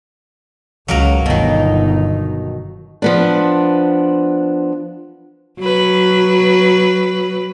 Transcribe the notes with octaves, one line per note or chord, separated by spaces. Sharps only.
C#2 F#3 A#3 A#4
G1 B2 D#3 D#4
F3 B3 D4
F#3 B4